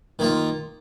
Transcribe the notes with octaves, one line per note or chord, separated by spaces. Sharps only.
D#3 A#3 F4